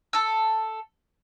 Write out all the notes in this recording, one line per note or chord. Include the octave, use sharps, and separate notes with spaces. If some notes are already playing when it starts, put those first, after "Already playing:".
A4 E6